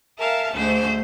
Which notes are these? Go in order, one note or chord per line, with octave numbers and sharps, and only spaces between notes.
A#4 E5 F5 G#5 A5
D2 G#2 A3 C5